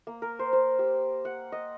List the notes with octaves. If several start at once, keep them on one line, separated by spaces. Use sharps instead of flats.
A#3
A#4
C5
C5
G4
F#5
D#5